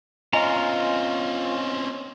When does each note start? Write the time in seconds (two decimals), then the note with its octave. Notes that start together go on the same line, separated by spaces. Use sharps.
0.33 C4 C#4 F4 D#5 G#5 A#5